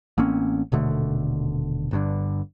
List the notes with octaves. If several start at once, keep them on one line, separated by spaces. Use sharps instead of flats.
A1 A#3 C4 C#4
D#1 B2 D3 A3
G1 G2 D3